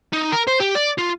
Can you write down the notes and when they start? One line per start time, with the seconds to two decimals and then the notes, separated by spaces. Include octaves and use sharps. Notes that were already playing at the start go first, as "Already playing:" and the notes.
0.13 D#4
0.32 A#4
0.47 C5
0.60 G4
0.75 D5
0.98 F4